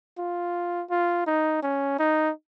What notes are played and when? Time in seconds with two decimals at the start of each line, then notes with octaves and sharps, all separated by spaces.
0.18 F4
0.90 F4
1.27 D#4
1.63 C#4
1.99 D#4